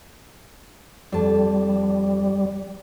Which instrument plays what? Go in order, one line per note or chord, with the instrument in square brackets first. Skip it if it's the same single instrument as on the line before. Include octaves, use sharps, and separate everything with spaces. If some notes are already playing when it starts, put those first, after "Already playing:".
[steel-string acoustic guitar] F2 A5 [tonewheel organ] G3